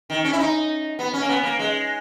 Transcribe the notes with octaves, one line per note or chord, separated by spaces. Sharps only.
D#3
C#4
E4
D#4
B3
C#4
A#3
B3
A#3
G#3